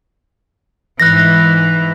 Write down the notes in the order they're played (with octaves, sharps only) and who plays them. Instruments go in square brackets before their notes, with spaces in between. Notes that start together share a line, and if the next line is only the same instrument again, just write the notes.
[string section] G#2 E3 [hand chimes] F#6 A#6